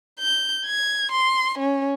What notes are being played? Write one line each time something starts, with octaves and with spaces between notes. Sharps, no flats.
G6
G#6
C6
C#4